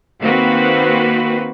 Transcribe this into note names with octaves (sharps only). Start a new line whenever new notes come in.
D#3 A#3 C4 F#4 B4